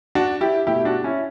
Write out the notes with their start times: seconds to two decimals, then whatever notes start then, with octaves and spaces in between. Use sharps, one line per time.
0.15 D4 F#4
0.41 E4 G4
0.67 B2 A3 E4 G4
0.85 D4 F#4
1.04 C#4 E4